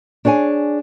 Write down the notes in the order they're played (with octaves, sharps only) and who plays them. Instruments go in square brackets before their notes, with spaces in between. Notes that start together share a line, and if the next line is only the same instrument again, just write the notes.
[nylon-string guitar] D4 G#4 C#5 G#5